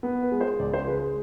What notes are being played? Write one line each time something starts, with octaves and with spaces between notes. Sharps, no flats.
B3
B4
G#3
C5
C#2 D5
C5
G#3 B4